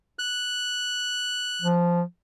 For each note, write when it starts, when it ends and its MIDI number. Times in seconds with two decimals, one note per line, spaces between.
0.19 1.67 90
1.62 2.02 53